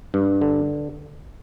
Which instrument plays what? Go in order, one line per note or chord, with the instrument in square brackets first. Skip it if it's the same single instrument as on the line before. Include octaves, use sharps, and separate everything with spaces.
[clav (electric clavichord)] G2
D3